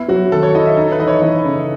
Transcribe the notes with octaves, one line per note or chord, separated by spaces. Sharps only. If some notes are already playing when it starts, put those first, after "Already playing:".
Already playing: B3 E4
F#3 F#4
D#3 A4
C#5
E4 D#5
E5
D#4 A4
B4
E3 D#5
C#5
E3
C#3